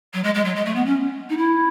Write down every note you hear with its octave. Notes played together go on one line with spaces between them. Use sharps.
F#3
G#3
G#3
F#3
G#3
A3
B3
C#4
D#4
E4